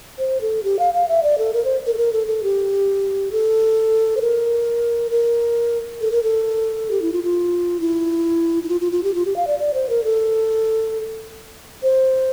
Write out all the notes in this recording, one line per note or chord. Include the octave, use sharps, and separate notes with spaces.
C5
A4
G4
F5
F5
E5
D5
A4
A#4
C5
A#4
A4
A#4
A4
A4
G4
A4
C5
A#4
A#4
A4
A#4
A4
G4
E4
F4
F4
E4
E4
F4
F4
F4
G4
F4
G4
F5
D5
D5
C5
A#4
A4
C5